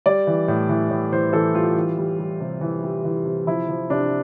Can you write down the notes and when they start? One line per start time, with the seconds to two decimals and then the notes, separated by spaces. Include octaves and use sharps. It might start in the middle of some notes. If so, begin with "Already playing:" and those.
0.06 G3 D5
0.27 E3
0.48 A2
0.69 E3
0.91 A2
1.12 E3 C5
1.33 E3 A4
1.54 G3 F4
1.76 E3
1.98 G3
2.19 G3
2.40 C3
2.61 E3
2.83 G3
3.05 E3
3.25 C3
3.47 F3 E4
3.69 F3
3.90 C3 D4